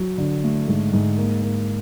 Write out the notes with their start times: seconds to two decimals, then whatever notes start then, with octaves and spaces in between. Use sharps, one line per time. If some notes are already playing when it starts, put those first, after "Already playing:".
Already playing: F#3
0.18 D3
0.44 A3
0.68 G#2
0.93 G#2
1.18 A#3
1.42 A#3